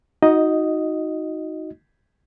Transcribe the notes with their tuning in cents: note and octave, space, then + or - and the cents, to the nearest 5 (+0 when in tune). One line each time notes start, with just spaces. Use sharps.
D#4 +20 F#4 -10 D#5 +0